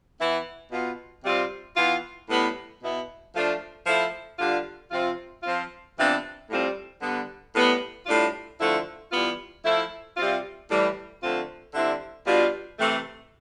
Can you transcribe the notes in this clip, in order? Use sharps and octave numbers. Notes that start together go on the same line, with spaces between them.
E3 B3 E4
B2 B3 F4
C3 G3 C4 F4
E3 B3 F4
A2 G3 B3 E4
B2 B3 E4
F3 A3 D4 F4
F3 A3 E4
D3 G3 D4 F4
C3 F3 C4 F4
F3 C4 F4
C3 E3 B3 D4 F4
A2 G3 C4 F4
D3 G3 B3
A2 G3 B3
A2 G3 D4 F4
D3 F3 A3 E4
E3 G3 B3 F4
F3 A3 E4
C3 G3 C4 F4
A2 E3 G3
D3 F3 A3 C4 F4
D3 G3 C4 E4
B2 G3 D4 F4
C3 E3 A3